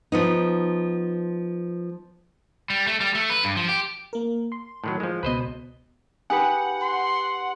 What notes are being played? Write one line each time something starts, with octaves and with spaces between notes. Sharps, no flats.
F3 B3 D#4
G3
A3
G3
A3
B4
G2
F3
G4
A#3 A#4
C6
A2 D#3 F#3
F3 G#3
C#2 B2 B4 C5 D#5
D#4 G4 B4 F#5 G#5
C6